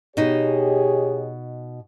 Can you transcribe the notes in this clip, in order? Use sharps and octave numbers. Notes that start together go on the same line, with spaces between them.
B2 D#4 G4 G#4 C#5